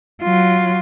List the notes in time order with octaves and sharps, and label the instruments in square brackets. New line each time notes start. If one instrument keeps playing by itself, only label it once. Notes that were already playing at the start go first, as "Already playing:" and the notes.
[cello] F#3 F4